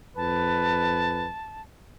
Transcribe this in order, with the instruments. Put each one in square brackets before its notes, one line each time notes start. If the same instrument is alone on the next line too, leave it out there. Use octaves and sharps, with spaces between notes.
[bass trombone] F2 [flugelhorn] B4 [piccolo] A5